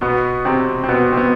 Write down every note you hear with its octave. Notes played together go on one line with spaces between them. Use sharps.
B2 B3
C3 C4
C4
B2 B3
C4
B2 B3